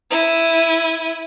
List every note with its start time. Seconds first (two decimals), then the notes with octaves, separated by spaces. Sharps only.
0.11 E4 D#7